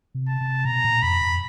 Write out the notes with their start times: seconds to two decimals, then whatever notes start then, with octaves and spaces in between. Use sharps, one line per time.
0.15 C3
0.28 A5
0.41 C3
0.65 B2 A#5
0.85 A#2
1.02 F2 B5
1.21 F2